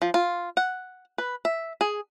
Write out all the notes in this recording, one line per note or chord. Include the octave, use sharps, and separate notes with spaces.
F3
F4
F#5
B4
E5
G#4